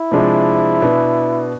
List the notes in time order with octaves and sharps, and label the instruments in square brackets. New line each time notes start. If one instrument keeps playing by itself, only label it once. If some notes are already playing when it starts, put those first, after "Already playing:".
Already playing: [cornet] E4
[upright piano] C3 F3 G#3 D4
B2 B3 D4